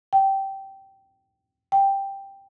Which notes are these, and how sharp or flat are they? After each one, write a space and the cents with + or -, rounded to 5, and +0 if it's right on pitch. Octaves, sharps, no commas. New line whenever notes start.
G5 -15
G5 +5